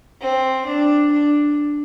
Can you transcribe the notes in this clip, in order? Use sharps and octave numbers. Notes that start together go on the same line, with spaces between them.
C4
D4
D4